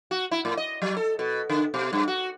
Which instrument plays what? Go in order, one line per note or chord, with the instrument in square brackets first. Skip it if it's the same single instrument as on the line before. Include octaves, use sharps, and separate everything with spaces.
[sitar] F#4
E4
A2
D#5
F#3
A4
B2
D3
B2
G2
F#4